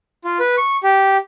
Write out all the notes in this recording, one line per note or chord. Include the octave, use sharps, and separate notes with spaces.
F4
B4
C#6
G4